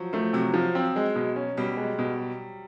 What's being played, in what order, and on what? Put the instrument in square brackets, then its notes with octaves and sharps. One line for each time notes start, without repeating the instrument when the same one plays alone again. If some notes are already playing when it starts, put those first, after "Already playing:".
Already playing: [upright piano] F3 F#3
[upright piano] F3 [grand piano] A3
[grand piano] C3 [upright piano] F#3
[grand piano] F3
C4
G#3
B2
C#4
[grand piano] B2 [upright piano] G3
[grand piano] G#3
B2